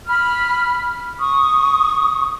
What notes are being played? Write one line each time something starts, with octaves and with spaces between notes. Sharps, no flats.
B5 F6
C#6 D#6